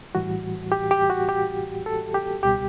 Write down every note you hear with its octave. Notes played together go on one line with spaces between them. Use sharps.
A2 E3 G3 F#4
G4
G4
F#4
G4
A4
G4
C#2 B2 G3 G4